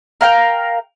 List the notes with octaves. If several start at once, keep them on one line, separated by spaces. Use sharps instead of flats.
A#4 F5 G5